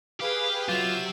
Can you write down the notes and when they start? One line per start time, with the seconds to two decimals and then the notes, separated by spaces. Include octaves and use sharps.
0.20 G4 G#4 B4 F5
0.68 F#3 F4 G4 E5 E7